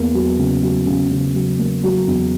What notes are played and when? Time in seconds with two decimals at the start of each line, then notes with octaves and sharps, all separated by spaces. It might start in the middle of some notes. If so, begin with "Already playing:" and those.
Already playing: E2 A#3
0.14 F#3
0.38 C#3
0.63 F#3
0.86 C#3
1.11 C#3
1.35 F#3
1.59 A#3
1.83 F#3
2.08 E2